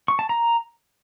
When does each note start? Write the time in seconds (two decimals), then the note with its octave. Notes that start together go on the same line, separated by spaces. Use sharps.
0.08 C#6
0.19 A5
0.29 A#5